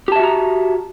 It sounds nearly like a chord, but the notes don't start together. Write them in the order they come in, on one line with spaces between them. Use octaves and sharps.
G4 A5 E5 F#4 A#5